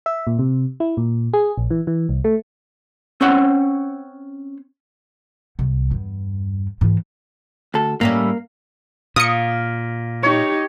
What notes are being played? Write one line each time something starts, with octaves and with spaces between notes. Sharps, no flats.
E5
A#2
C3
E4
A#2
G#4
A#1
E3
E3
C2
A3
C4 C#4 C5 C#5 F#5
C2
E2 G2
G#2 E3
D2 A4
A2 G3 A#3 C#4
A#2 F5 D#6 C#7
D#4 G4 C#5